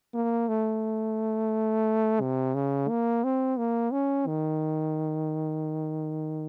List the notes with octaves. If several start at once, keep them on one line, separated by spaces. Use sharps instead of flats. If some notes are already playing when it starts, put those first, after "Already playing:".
A#3
A3
C3
C#3
A#3
C4
A#3
C#4
D#3